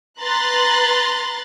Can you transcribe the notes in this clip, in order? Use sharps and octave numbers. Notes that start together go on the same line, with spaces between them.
B4 A#5 C6 F#6 A6